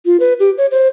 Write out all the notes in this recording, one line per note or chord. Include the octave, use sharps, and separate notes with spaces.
F4
B4
G4
C#5
C5